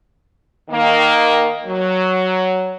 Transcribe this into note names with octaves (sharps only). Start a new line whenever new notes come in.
D#3 A#3
F#3